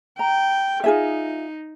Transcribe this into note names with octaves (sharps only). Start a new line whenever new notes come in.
G5 A#5
D#4 F4 G#4 E5